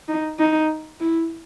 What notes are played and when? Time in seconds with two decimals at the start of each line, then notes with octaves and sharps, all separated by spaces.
0.08 D#4
0.39 D#4
1.00 E4